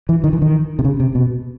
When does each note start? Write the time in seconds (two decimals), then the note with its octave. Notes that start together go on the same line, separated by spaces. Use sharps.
0.09 E3
0.24 D#3
0.33 E3
0.42 D#3
0.79 C3
0.85 C#3
1.00 C3
1.15 B2